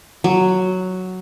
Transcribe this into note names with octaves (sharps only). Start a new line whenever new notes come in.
F#3